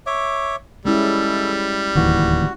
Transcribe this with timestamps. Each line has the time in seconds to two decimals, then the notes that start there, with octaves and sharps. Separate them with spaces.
0.06 C#5 E5 D6
0.85 G3 G#3 C#4 E4 A4
1.95 D1 D#2 E3 F#4